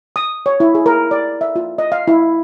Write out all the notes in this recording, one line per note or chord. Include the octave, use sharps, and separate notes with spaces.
D#6
C#5
E4
G#4
A#4
D5
E5
F4
D#5
F5
E4